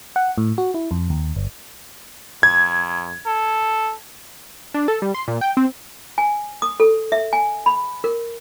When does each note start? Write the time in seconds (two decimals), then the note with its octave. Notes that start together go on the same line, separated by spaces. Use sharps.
0.16 F#5
0.38 A2
0.58 F#4
0.74 E4
0.91 F2
1.10 D#2
1.36 G1
2.43 F2 G#6
3.26 A4
4.74 D4
4.88 A4
5.02 G3
5.15 C6
5.28 A#2
5.41 G5
5.57 C4
6.18 G#5
6.62 D#6
6.80 A4
7.12 E5
7.33 G#5
7.66 B5
8.04 A#4